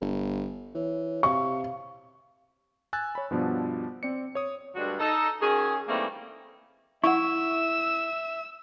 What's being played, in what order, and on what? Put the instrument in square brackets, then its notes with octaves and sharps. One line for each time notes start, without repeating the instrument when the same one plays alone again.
[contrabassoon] G1
[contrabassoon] E3 [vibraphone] C#5
[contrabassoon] C3 [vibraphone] F5 [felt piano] C#6
[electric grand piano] G#5 E6 F#6 A6
C#5 B5
G2 B2 F3 B3 D4
C4 D5 C#7
C#5 D#6
[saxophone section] D2 G2 G#3 D4 F#4
D#4 A4
D#3 C#4 F#4 G#4
D#3 E3 G3 A3 A#3 C4
[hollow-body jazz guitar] E4 [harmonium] E5 [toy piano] F#5 C#6 [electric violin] E6